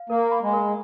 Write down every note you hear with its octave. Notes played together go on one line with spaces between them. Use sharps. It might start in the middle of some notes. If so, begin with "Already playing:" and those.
Already playing: F5
A#3 A#4
B5
G#3
A#4